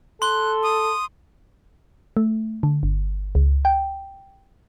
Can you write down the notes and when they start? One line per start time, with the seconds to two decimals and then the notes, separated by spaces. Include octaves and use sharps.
0.22 A4 C6 F#6 G7
0.63 D#6
2.17 A3
2.63 D3
2.83 G1
3.35 C#2
3.65 G5